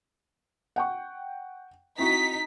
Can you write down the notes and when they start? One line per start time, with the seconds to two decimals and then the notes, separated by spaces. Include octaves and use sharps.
0.76 F#5 G5 C#6
1.99 C4 D#4 E4 F#4 B6